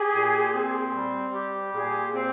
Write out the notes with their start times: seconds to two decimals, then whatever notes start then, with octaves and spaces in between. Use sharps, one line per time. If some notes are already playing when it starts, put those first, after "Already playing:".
Already playing: G4 G#4
0.14 A#2
0.54 C4
0.95 G3
1.34 G4
1.74 A#2 G#4
2.13 C4 C5